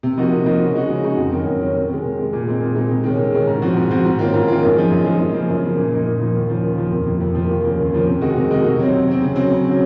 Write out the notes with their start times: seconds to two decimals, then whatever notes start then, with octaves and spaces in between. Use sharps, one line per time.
0.03 C3
0.17 F3 A#3 D#4 F#4
0.31 C3
0.46 F3 A#3 D#4 F#4
0.61 C#3
0.74 G#3 D#4 F#4
0.89 C#3
1.04 G#3 D#4 F#4
1.17 F2
1.32 D#3 F#3 C#4
1.47 F2
1.61 D#3 F#3 C#4
1.75 C3
1.89 D#3 G#3
2.04 C3
2.18 D#3 G#3
2.33 A#2
2.47 G#3 C4 D#4
2.61 A#2
2.75 G#3 C4 D#4
2.90 C3
3.04 D#3 G#3 C#4
3.18 C3
3.33 D#3 G#3 C#4
3.47 G#2
3.62 F3 C4 F#4
3.77 G#2
3.91 F3 C4 F#4
4.05 G#2
4.19 D#3 A#3 C#4 F4
4.33 G#2
4.48 D#3 A#3 C#4 F4
4.63 F#2
4.76 F3 G#3 D#4
4.91 F#2
5.05 F3 G#3 D#4
5.19 F#2
5.34 C#3 F3 A#3
5.49 F#2
5.63 C#3 F3 A#3
5.77 A#2
5.91 F3 A#3 D#4
6.06 A#2
6.20 F3 A#3 D#4
6.35 D#2
6.48 C#3 F3 A#3
6.63 D#2
6.78 C#3 F3 A#3
6.92 F2
7.06 C3 F3 A#3
7.20 F2
7.35 C3 F3 A#3
7.49 D#2
7.64 C#3 F3 A#3
7.78 D#2
7.92 C#3 F3 A#3
8.07 C3
8.21 D#3 G#3 D#4 F#4
8.36 C3
8.50 D#3 G#3 D#4 F#4
8.65 C3
8.79 F#3 C4
8.93 C3
9.07 F#3 C4
9.22 C#3
9.36 F#3 C4
9.50 C#3
9.65 F#3 C4